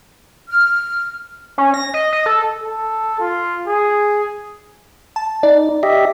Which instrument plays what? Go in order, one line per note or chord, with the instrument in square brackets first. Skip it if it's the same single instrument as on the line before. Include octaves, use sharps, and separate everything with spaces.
[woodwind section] F6
[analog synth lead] C#4
A#6
D#5
D#5
A4
[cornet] A4
F4
G#4
[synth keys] A5
[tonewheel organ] D#4 [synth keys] D5
[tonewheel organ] G4 D#5 E5